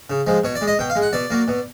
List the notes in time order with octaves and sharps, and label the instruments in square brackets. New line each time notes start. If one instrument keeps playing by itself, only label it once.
[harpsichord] C#3
F3 G#3
B2 C#5
D5
G#3
D#5
B2 G5
F5
G#3
F#5
B2 D5
F#3 A#3
B2